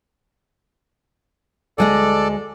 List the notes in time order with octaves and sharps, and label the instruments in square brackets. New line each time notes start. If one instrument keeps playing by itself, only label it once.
[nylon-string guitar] D2 G#3 D#5 [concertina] A4 D5